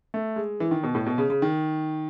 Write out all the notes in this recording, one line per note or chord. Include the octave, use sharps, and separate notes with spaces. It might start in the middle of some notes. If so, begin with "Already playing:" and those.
A3
G#3
E3
D#3
B2
A2
B2
C#3
C#3
D#3